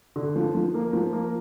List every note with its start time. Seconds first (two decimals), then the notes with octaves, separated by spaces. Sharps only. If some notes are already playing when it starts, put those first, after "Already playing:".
0.16 D3
0.36 F3
0.55 F3
0.74 A#3
0.93 F3
1.13 A#3